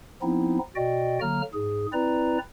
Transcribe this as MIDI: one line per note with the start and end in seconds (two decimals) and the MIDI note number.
0.22 0.59 53
0.22 0.59 59
0.22 0.59 60
0.22 0.59 63
0.22 0.59 64
0.76 1.19 47
0.76 1.19 66
0.76 1.19 74
0.76 1.19 75
0.76 1.19 79
1.21 1.42 50
1.21 1.42 54
1.21 1.42 58
1.21 1.42 82
1.21 1.42 89
1.54 1.86 44
1.54 1.86 68
1.93 2.38 60
1.93 2.38 64
1.93 2.38 71
1.93 2.38 74
1.93 2.38 82